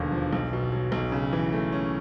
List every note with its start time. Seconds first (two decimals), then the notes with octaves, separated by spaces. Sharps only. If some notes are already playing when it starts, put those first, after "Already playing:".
Already playing: E1 D#2 D3
0.12 F3
0.33 B1
0.53 B2
0.72 F#3
0.92 B1
1.12 C#3
1.33 E3
1.53 A3
1.72 C#4